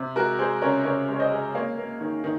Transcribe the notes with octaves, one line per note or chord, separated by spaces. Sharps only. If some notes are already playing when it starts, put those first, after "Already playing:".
Already playing: C3
G#3 F#4 A#4
G#3 G#4 C5
C#3 A#4 C#5
C#3 A#4 C#5
G#3
C#5
C5 D#5
G#3
A#3 C#5 F5
A#3
D#3
D#3